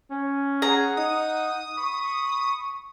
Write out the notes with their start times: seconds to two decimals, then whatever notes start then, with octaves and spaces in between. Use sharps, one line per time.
0.10 C#4
0.62 G#4 F#5 A#5
0.97 D#4 D#6
1.77 B5 C#6